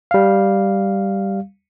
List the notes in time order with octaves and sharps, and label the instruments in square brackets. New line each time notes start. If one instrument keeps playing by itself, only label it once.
[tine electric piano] G3 F5